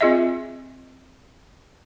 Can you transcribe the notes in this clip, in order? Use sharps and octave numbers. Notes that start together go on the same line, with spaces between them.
C4 F4 G#4 D#5 E5